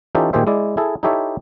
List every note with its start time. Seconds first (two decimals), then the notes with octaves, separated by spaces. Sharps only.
0.15 E3 C#4 D#4 F4 G4 A4
0.33 A#2 D#3 G4 G#4 C5 E5
0.47 G#3 E4 D5
0.77 E4 G#4 A4
1.03 D#4 E4 G4 A4 C#5 E5